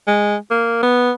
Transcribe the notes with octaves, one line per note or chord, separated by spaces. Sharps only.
G#3
A#3
B3